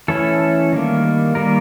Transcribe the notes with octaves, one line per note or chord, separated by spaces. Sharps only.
E3 A3 C#4 E4 A4
D#3 G3 A#3
D#3 G3 A#3 A#4